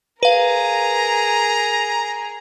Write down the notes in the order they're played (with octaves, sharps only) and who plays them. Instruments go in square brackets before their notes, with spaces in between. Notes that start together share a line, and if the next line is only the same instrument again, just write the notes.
[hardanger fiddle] G#4 A#4 [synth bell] B4 F5 [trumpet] A#5